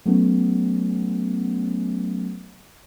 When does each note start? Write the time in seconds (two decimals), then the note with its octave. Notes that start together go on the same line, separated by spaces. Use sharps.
0.06 F#3 A3 B3 C#4